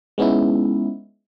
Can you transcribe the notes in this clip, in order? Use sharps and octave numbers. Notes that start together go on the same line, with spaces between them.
G#3 B3 C#4 D#4 E4